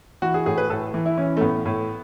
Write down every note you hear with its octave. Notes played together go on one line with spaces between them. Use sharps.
E3 F#4
G#4
A2 G#4
B4
A2 A4
E3
E4
E3 C#4
A3
A2 B3
A2